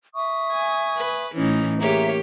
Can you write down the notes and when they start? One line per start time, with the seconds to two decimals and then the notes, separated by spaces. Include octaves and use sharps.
0.14 E5 C#6 D#6
0.52 G#5
0.97 B4
1.35 A2 E3 C#4 D#4
1.81 A#3 G4 G#4 C#5 E5 A#5